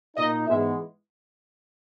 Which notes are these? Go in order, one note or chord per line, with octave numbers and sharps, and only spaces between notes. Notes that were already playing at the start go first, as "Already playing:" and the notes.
A#2 A#3 D#4 D#5
G#2 E3 G#3 B3 E5